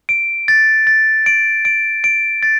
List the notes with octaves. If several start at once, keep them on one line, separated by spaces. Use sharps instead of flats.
D7
A6
A6
D7
D7
D7
A6